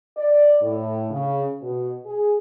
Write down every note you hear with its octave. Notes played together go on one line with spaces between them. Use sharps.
D5
A2
C#3
B2
G#4